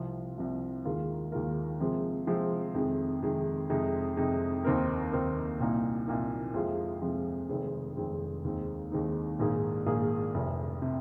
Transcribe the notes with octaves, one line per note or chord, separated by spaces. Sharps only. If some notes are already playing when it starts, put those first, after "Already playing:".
Already playing: C2 C3 F3
C2 C3 F3
D#2 D#3 G#3 F4 A#4
D#2 D#3 G#3 F4 A#4
C3 F3 G#3 C4
C3 F3 G#3 C4
F2 C3 D#3 G#3
F2 C3 D#3 G#3
F2 C3 G#3 D#4
F2 C3 G#3 D#4
D#2 D#3 C4 D#4 A#4
D#2 D#3 C4 D#4 A#4
C2 A#2 A#3 D#4
C2 A#2 A#3 D#4
F2 C3 F3 G#3 F4
F2 C3 F3 G#3 F4
F1 F2 D#3 G#3 C4
F1 F2 D#3 G#3 C4
D#2 D#3 G#3 C4 D#4
D#2 D#3 G#3 C4 D#4
A#1 G#2 D#3 A#3 G#4
A#1 G#2 D#3 A#3 G#4
F1 F2 C3
C3